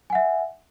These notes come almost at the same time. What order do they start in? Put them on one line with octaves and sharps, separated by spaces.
G#5 F#5 E5